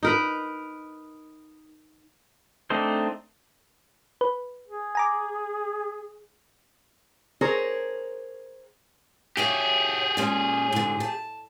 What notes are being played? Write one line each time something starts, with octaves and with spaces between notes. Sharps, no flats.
D#4 A#4 B4
A3 C4 D4 D#4 C5
B4
G#4
G#5 A#5 D6
G#4 A#4 C5 C#5
G4 G#4 C#5 E5 F5
A#2 G#3 C#4
G#2 D3
A5